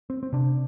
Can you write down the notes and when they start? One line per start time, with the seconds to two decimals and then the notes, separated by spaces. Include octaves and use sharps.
0.10 C4
0.23 C4
0.32 C3 D4